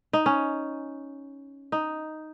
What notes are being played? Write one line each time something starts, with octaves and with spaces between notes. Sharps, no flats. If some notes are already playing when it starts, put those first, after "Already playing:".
D#4
C#4
D#4